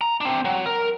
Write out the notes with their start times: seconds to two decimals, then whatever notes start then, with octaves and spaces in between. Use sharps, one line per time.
0.01 A#5
0.21 C4 D4
0.45 F#3
0.66 A#4